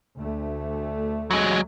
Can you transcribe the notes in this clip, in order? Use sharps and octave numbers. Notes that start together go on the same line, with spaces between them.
D2 A3
F#3 G#3